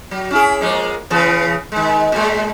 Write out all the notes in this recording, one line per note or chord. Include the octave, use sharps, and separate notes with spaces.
F#3
C#4 E4 G#4
F3 G#3 A#3
C#3 E3 B3
D#3 G#3
A2 G#3